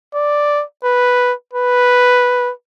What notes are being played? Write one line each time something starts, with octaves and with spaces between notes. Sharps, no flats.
D5
B4
B4